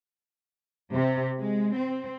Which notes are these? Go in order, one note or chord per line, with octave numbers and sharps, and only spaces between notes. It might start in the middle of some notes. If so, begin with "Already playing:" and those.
C3
G#3
C4